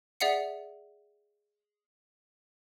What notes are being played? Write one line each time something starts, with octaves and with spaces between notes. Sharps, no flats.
G#4 D5 E5 F#5 C7 C#7